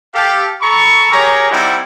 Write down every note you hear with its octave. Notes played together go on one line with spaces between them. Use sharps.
G4 A4 F5
A4 A#5 B5 C#6
G4 G#4 A#4 C#5 A#5
G3 C4 D#4 E4 D5 F#5